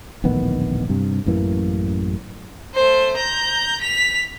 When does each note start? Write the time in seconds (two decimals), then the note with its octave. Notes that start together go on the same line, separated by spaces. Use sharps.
0.24 D1 A#1 D#3 B3
0.89 G2 C3
1.26 A1 F#2 E3 A#3
2.74 A3 C5
3.17 A#5 G6
3.81 B6 F7